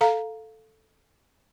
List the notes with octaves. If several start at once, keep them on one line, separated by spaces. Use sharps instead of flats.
A4 F5 A#5